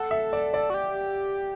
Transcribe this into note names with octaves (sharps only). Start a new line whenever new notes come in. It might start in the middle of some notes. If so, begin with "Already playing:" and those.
Already playing: A4 F#5
E5
D5
D5
F#4
G4